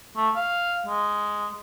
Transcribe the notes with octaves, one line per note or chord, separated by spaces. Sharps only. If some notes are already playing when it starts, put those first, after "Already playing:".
A3
F5
G#3